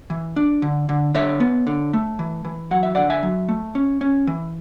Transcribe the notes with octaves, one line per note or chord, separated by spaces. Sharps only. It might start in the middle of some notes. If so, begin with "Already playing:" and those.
E3
D4
D3
D3
D3 C#5 E5
B3
D3
A3
E3
E3
F#3 F#5
E5
D3 D5 F#5
E5 G#5
F#3
A3
C#4
C#4
E3